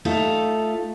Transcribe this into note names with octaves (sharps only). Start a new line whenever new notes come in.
A3 D#4 F4 A4